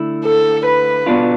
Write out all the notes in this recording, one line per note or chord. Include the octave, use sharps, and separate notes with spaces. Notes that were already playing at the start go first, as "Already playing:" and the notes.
Already playing: D3 A3 E4
A4
B4
B2 B3 D4 F4